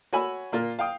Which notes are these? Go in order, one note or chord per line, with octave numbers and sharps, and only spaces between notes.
F#4 C#5 G#5 B5 E6
A#2 A#3 F4
F5 G5 D#6